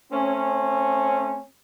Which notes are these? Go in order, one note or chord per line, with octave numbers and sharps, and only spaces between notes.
A3 C4 C#4